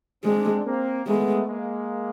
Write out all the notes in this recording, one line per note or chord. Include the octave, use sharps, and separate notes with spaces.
G#3 C4 D4
A#3 C4
G#3 A3 B3
G#3 A#3